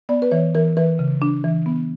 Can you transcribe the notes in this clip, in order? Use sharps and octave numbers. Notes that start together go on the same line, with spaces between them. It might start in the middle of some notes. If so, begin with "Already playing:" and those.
B3 D5
B4
E3 C#5
E3 A#4
E3 B4
C#3
D4
E3
B3